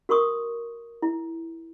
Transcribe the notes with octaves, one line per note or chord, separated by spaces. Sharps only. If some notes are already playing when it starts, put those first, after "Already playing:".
F#4 A#4 C6 C#6 D#6
E4